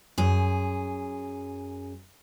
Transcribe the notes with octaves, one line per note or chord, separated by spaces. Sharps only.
F#2 G#4